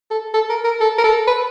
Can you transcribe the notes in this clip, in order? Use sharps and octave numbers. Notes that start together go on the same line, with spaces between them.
A4
A4
A#4
A#4
A4
A#4
A4
B4